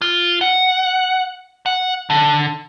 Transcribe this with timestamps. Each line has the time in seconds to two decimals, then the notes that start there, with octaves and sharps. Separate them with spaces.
0.02 F4
0.41 F#5
1.66 F#5
2.10 D3